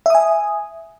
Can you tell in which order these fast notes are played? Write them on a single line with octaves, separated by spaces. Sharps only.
E5 D#6 G#5